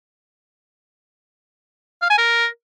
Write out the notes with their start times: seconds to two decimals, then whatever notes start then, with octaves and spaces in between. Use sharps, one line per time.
2.02 F5
2.10 G#5
2.18 A#4